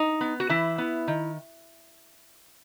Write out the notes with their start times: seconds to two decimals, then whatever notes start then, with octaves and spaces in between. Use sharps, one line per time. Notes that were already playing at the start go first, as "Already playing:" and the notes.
Already playing: D#4
0.21 B3
0.40 F#4
0.49 E3 E4
0.78 B3
1.08 D#3